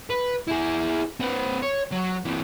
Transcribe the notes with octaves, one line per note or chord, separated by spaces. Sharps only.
B4
E4 G#4
C4 B4
C#5
F#3
E3 C4